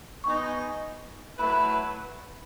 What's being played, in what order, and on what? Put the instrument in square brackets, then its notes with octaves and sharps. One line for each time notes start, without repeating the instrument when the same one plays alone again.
[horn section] G#3 B3 D#4 [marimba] C#6
[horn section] F#3 A3 E4 B4 [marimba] B5
[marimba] B5